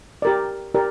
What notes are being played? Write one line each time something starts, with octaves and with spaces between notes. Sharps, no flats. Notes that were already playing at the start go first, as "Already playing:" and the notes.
G4 A#4 D5
G4 A#4 D5